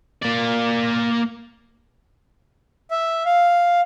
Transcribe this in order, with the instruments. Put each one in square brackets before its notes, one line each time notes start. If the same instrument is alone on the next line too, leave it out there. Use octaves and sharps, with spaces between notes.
[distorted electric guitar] A#3 D5
[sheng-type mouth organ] E5
F5